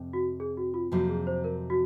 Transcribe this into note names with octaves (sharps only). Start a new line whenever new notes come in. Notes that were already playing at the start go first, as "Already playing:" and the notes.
Already playing: F2 C3
F#4
G#4
F#4
F4
F2 C3 F#3 A#3 F#4
G#4
C5
A#4
F#4